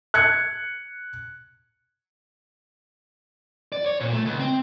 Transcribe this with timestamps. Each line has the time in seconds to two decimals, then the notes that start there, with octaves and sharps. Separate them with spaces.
0.14 F#6 G#6 C#7
3.72 D5
3.86 C#5
4.00 A#2
4.13 A3
4.25 C#2
4.39 C4